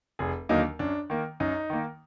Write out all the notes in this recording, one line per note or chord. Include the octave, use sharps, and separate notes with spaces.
F1 G#4
D#2 D3 F#3 A#3 D#4
F#2 D4
D#3 A#3
F#2 D#4
D#3 A#3